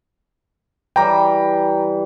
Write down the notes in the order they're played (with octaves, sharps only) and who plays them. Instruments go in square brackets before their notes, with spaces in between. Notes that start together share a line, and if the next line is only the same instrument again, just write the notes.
[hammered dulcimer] E3 G3 [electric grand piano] G5 A#5